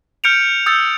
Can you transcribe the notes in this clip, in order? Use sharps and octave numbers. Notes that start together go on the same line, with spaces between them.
F6 G6 C#7 D7 F7
D#6 E6 G6 A6 C#7